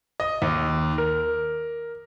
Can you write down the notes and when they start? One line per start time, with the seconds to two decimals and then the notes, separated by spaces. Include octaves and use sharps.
0.20 D#5
0.42 D#2
0.98 A#4